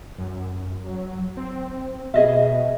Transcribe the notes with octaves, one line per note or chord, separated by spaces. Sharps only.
F#2
F#3
C4
B2 G#4 D#5 E5